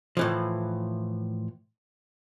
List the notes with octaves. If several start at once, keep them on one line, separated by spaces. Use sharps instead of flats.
A2 E3 F3